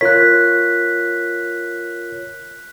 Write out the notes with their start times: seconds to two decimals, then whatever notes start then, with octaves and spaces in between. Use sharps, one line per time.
0.01 F4 A#4 C#5 F#6 B6